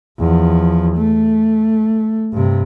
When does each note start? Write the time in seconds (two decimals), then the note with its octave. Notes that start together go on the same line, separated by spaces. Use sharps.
0.19 E2 F3
0.97 A3
2.33 G2 C3